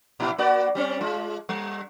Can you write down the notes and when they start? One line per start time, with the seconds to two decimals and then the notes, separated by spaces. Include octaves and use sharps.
0.20 A#2 E4
0.38 A#3 F#4 D5
0.75 G3 C4 C#4
1.01 G#3 F4
1.49 G3